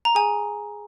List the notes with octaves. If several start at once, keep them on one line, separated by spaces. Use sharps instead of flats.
A#5
G#4 G#5